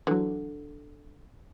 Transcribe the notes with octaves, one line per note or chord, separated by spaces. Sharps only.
D3 E3 F#3